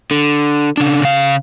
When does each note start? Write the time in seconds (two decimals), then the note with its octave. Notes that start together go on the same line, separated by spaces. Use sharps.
0.11 D3
0.77 C#3 D4
1.02 C#3 F5